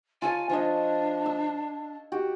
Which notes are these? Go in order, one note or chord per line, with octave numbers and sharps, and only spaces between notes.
F4 A4 C#5 G#5
F3 D4 D#5
E6
F#4 G4